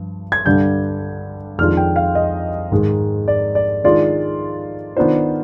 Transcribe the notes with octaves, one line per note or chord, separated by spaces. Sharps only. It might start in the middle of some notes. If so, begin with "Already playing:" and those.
Already playing: G2 F3
G#6
G2 D3 G3 G6
F2 D#3 G#3 D4 F4 F6
G5
F5
D#5
G#2 D#3 G#3
D5
D5
D#3 G#3 D4 F4 D5
D#3 B3 D4 F4 C5